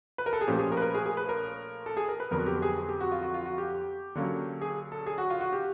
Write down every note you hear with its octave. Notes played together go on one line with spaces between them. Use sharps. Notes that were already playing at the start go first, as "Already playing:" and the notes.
B4
A#4
A4
G#4
A#2 F3 A3 C#4 G4
G#4
A#4
B4
A#4
G#4
G#4
B4
A#4
A4
G#4
A#4
B4
F2 D3 F#3 B3 A#4
G4
G#4
G#4
G4
F#4
F4
F#4
F4
F#4
G4
D3 F#3 A#3 C#4
G#4
A4
G#4
F#4
F4
F#4
G4